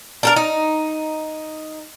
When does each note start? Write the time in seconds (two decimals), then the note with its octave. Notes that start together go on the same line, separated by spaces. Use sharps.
0.23 D4 A4 A#4
0.36 D#4